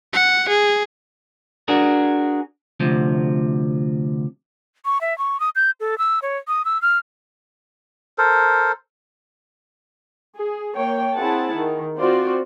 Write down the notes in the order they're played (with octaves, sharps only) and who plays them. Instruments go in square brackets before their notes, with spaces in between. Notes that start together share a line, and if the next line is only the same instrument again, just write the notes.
[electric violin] F#5
G#4
[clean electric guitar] D4 F#4 G#4 A#4
D2 C3 F3
[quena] C#6
E5
C#6
D#6
G6
A4
E6
C#5
D#6
E6
F6
[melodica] A4 A#4 C5
[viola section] G#4
A#3 C#5 G5
C4 E4 G#4 F#5 A5
D#3
C4 F4 F#4 C5 D5